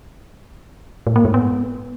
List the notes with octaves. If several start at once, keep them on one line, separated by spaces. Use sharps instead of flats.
A2
A#3
G#2
B3